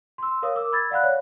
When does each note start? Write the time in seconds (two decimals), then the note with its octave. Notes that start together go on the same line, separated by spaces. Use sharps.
0.18 C6 E6
0.43 A#4 C#5 F5 D#6
0.55 A#4 D6 E6
0.72 B5 E6 G#6 A6
0.91 D5 F5 F#5 B5 F#6
1.03 C#5 F5